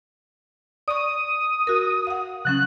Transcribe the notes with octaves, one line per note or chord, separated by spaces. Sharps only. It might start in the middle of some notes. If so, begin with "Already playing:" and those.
D5 C#6 D#6
F#4 A#4
F5 F#5
C#3 F#3 C#4 F#6